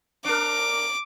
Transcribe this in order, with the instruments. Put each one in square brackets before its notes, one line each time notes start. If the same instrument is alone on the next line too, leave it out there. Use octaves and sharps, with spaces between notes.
[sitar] D4 A#4 [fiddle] D6